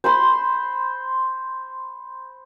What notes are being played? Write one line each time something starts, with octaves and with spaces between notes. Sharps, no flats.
C5 B5 C6